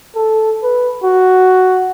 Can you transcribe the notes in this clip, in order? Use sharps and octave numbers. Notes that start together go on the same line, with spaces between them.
A4
B4
F#4